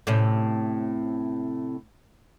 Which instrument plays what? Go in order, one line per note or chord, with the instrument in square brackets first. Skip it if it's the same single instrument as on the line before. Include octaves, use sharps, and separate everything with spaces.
[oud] A2 C3 C#4